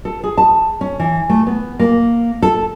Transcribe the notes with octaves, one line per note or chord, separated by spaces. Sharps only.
A4
G#4
A5
C#4
E3
A3
B3
A#3
A4